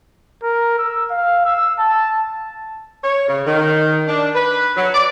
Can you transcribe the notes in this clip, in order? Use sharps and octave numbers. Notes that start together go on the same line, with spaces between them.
A#4
E6
F5
E6
A5
C#5
C#3
D#3
D4
B4
F#3
D5